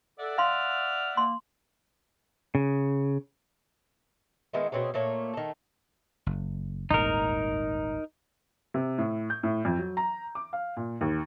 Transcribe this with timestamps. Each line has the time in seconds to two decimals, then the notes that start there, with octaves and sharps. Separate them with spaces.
0.19 A4 D5 E5 F#5
0.38 F5 C6 F6
1.17 A#3 C6
2.55 C#3
4.53 D#3 G#3 B3 E4
4.72 B2 C4 C#4 G#4
4.94 A#2 A3 A#3 C#5
5.33 D#3 A3
6.26 F#1
6.91 D#1 G#1 E2 D#4 A#4
8.74 C3
8.98 A2
9.30 G6
9.43 A2
9.65 F2
9.79 F#3
9.97 A#5
10.35 D6
10.53 F5
10.77 A#2
11.01 D#2